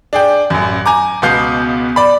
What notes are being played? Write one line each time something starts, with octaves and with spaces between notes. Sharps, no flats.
D4 G#4 G5
A1 F#2
G#5 A#5 D6
C#2 B2 B3 F5 G6
D5 B5